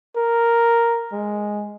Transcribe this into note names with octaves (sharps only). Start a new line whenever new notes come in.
A#4
G#3